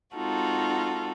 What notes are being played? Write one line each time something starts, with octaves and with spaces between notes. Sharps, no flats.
G#3 C4 D#4 F4 F#4 A4